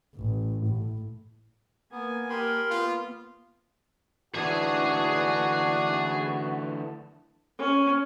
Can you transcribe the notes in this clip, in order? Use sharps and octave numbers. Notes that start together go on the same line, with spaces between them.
A1
A2
A#3 B3 G#5
G4 A#4 B5 C6
B3 F4
D3 E3 A3 D4 F#4 G#4 G#5
C#4